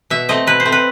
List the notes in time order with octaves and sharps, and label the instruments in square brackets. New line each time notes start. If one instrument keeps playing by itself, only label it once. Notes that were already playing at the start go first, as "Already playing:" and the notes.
[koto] B2 E5
A3 C4 D#5
B2 B4
C5
A3 C4
B4